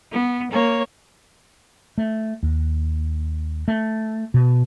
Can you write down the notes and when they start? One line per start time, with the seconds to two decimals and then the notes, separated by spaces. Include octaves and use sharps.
0.11 B3
0.50 A#3 C#5
1.98 A3
2.43 D#2
3.68 A3
4.34 B2